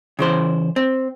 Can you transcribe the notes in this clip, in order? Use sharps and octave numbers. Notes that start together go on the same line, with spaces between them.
C#3 E3 C5
C4